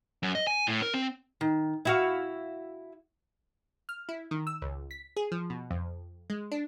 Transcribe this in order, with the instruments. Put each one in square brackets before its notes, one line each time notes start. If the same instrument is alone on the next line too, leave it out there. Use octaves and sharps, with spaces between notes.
[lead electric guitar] F#2
D#5
G#5
A2
A#4
C4
[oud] D#3
E4 F#4 F5
[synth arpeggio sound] F6
E4
D#3
E6
C#2
B6
G#4
F3
B2
F2
G#3
D4